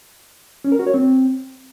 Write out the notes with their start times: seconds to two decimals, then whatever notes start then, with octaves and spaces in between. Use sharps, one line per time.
0.64 C#4
0.72 A#4
0.79 F#4
0.87 C#5
0.94 C4